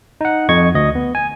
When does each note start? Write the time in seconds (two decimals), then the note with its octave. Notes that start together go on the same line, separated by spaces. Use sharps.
0.21 D#4 F#5
0.49 F2 D#5 C#6 G#6
0.75 D2 D#5
0.95 B3
1.15 G#5